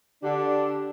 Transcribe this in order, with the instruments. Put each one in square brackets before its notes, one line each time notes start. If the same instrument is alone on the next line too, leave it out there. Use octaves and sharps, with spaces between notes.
[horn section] D3 D4 [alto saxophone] G4